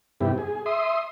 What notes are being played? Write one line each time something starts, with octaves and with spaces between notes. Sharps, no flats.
G2 C3 B3 E4 G4
G#4
E5 C6 D#6